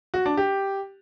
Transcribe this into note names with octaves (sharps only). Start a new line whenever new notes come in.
F#4
D4
G4